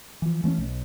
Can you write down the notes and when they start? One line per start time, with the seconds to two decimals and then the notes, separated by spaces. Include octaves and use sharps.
0.22 E3 F3
0.44 E3 A3 B3 C#4
0.58 B1